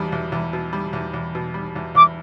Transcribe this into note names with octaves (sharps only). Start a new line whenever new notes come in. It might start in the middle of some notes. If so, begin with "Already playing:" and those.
Already playing: E2 B2 G3
E2
E2
B2
G3
E2
E2
B2
G3
E2
E2 D6